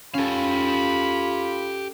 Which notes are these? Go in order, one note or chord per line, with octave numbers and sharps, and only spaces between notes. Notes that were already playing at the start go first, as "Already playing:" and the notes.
C#4 F4 G4 A4 F5 B5